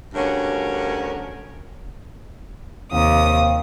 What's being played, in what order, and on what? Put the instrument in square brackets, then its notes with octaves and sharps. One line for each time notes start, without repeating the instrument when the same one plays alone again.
[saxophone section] D2 G2 C#4 F#4 A#4 C#5
[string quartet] D#2 D#6 [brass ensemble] C3 C4 F5